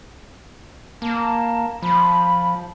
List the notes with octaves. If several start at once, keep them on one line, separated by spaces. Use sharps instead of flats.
A#3 A5
F3 B5